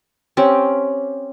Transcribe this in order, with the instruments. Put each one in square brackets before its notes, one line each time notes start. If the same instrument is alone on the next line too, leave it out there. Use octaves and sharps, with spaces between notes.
[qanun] C4 C#4 G4